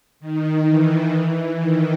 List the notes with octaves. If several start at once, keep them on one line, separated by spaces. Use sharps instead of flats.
D#3
E3
D#3